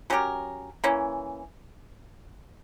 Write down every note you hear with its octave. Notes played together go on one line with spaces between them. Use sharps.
F#3 C#4 G4 A#4
E3 A#3 C#4